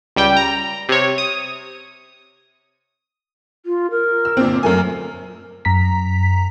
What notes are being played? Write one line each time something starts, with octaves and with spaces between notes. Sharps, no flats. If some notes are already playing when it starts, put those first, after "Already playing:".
C#2 G3 G5
A#5
C3 C#5
D#6
F4
A#4
E6
G1 A#2 C4
F#2 A3 A#4 G#5
F#2 A#5 B6